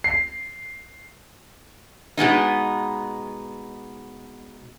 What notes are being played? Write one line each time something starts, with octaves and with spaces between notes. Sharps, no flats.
C7
B2 G#3 B3 D#4